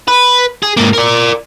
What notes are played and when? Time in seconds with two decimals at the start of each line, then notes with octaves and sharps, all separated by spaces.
0.08 B4
0.63 G#4
0.77 G#2 A#3
0.93 A#4 D5